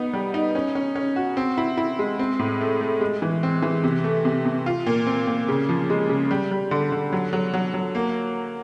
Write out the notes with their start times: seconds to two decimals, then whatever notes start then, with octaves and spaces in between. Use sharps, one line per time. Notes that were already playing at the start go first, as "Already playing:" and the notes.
Already playing: B3 D#4
0.13 G3
0.34 D#4
0.55 C#4
0.75 C#4
0.95 C#4
1.16 F#4
1.37 C4
1.58 E4
1.77 E4
1.99 G#3
2.19 C4
2.39 A2
2.61 A3
2.81 A3
3.01 G#3
3.22 E3
3.43 C4
3.62 E3
3.84 C3
4.04 A3
4.25 C3
4.46 C3
4.66 F4
4.87 A#2
5.07 C4
5.27 A#2
5.49 C#3
5.69 F3
5.90 G#3
6.09 C#3
6.31 G3
6.51 G3
6.71 D3
6.92 D3
7.12 F#3
7.33 F#3
7.54 F#3
7.74 F#3
7.95 A#3